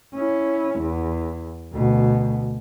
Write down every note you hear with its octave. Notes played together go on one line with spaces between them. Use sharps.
C#4 E4
E2
D2 B2